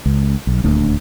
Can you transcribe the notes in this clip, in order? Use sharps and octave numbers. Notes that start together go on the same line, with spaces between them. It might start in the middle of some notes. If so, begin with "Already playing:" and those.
C#2
B1
D#1 D2